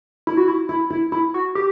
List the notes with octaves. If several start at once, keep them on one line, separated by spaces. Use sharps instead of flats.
E4
F#4
E4
E4
E4
E4
F#4
G4